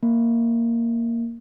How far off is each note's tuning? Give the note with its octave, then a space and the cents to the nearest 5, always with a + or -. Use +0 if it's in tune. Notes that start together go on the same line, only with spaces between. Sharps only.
A#3 -5